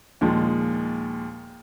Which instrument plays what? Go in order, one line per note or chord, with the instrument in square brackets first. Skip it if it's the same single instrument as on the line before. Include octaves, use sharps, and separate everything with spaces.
[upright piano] D#2 A#2 F3 G#3